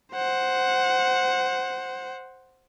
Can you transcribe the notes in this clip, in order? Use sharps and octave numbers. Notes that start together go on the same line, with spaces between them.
C5 F#5